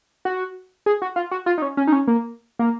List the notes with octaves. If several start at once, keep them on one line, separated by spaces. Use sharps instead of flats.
F#4
G#4
F#4
F4
F#4
F4
D#4
C#4
C#4
D#4
C#4
A#3
A#3